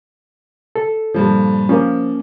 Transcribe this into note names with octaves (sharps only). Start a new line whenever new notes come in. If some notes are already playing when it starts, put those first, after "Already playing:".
A4
G2 A#2 F3
F3 A#3 C#4